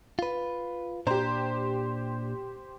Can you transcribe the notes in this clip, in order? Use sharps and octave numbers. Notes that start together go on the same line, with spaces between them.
F4 B4
A#2 D4 G4 C5 A#5